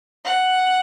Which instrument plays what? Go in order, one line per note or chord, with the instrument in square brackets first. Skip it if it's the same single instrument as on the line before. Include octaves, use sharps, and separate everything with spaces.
[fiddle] F#5